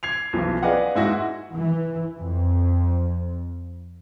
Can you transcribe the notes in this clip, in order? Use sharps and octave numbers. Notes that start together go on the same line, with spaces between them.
G#6 C7 F7
B1 E3 F3
G#4 B4 D5 D#5 F5 F#5
G#2 E4 F#4 A#6
E3
F2